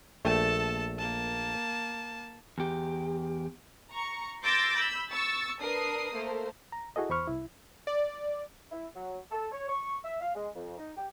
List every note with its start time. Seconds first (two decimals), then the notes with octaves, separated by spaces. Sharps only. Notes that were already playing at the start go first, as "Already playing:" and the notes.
0.25 A#1 A3 A4 G5 A5
0.98 A#3 A5
2.58 E2 G4
3.90 A#5 C#6
4.44 C6 D6 E6 G6 A6 A#6
4.75 B5 E6 G6
5.10 C#6 E6 A6
5.61 D4 A#4 B4 D#6 C7
6.13 A3 A#3 C5
6.72 A#5
6.96 E4 F#4 G#4 A4 D#5
7.09 E2 C5 B5 C#6 F6
7.27 C2 E4
7.87 D5
8.71 E4
8.94 F#3
9.31 A4
9.51 C#5
9.68 C#6
10.04 E5
10.20 F5
10.35 G#3
10.55 F2
10.77 D#4
10.97 G4